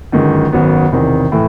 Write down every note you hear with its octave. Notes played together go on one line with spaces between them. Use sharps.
G1 F#2 D#3 G#3
G#1 F#2 D#3 F#3 B3
E1 E2 C3 D#3
A2 E3